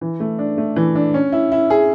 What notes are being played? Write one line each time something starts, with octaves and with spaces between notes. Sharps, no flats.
E3
A3
D4
A3
E3
D4
C#4
E4
E4
G#4